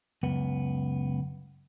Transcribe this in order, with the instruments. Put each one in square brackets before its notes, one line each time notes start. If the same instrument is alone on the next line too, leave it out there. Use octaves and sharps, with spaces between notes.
[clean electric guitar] C#2 F#2 B3